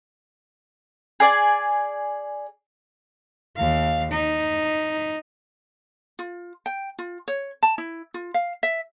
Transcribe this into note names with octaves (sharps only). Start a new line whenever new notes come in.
G#4 D5
D#2 F5
D#4
F4
G5
F4
C#5
A5
E4
F4
F5
E5